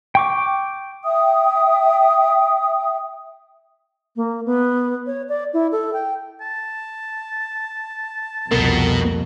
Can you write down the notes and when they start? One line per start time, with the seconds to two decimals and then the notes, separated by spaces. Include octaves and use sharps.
0.15 G5 C#6 D6
1.04 E5 G5 D#6
4.16 A#3
4.46 B3
5.06 C#5
5.29 D5
5.54 E4
5.72 A4
5.93 G5
6.41 A5
8.51 C2 F2 B2 A#4